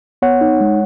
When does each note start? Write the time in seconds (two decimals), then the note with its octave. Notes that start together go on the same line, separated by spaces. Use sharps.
0.22 B3 C#5 F#5
0.41 D#4
0.61 G#3